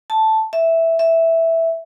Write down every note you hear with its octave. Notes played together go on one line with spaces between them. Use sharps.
A5
E5
E5